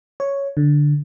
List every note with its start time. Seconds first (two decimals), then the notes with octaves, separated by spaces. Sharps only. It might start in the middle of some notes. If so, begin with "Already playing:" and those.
0.20 C#5
0.57 D3